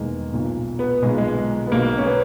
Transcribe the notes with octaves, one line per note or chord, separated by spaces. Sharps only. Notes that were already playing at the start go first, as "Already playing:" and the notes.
Already playing: E1 E2 D#3 G#3 A#3
B1 A#2
B3
B1 A#2 G#3
G#3
B3
B1 B2 A#3
C#4
B3